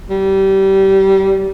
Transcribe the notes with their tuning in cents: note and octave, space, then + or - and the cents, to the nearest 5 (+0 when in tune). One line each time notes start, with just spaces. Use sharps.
G3 -25